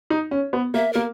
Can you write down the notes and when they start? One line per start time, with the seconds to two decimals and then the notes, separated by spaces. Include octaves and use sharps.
0.10 D#4
0.31 C#4
0.53 B3
0.74 A#3 E5
0.93 A#3 A#4